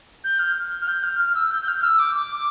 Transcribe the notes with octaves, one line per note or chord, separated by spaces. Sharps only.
G6
F6
F6
G6
F6
F6
F6
E6
G6
G6
F6
E6
D6
D6